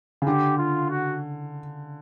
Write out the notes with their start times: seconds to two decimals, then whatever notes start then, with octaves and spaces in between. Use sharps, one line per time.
0.22 C#3
0.27 D3 G4
0.58 F4
0.90 F#4